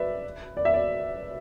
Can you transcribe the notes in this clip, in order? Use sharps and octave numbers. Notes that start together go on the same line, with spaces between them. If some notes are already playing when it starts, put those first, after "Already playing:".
Already playing: B4 D5 E5
D5
E5
D5